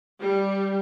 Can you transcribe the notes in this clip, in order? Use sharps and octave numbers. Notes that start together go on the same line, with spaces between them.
G3